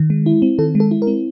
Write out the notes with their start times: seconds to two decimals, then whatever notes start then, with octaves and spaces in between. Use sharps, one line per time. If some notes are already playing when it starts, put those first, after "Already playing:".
Already playing: D#3
0.10 G#3
0.26 E4
0.42 C4
0.58 D#3 A4
0.75 G#3
0.80 A4
0.91 E4
1.02 A#4
1.07 C4